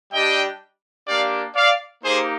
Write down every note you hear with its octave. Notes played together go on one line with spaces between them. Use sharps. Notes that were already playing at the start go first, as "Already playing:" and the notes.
G3 D4 G4 D#5 G5
A#3 D4 G4 D5 F5
D5 F5
A#3 D#4 G4 G#4 C5